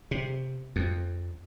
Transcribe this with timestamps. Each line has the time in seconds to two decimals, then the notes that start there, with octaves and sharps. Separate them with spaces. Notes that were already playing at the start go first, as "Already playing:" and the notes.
0.11 C3
0.76 F2